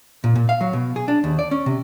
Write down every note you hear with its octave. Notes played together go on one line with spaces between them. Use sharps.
A#2
A#2
F5
F#3
B2
G#4
D4
D#2
D5
C#4
C3